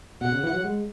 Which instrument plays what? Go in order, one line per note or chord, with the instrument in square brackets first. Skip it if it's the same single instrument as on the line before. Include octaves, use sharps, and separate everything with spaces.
[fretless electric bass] B2 [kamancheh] F#5
[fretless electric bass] C#3
E3
F#3
G#3